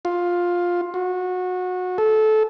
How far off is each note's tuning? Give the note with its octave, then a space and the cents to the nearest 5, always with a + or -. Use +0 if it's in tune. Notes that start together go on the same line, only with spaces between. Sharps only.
F4 +10
F#4 -25
A4 -20